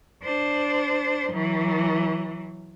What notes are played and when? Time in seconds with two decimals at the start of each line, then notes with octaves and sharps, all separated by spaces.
0.23 D4 C5
1.33 E3 F#3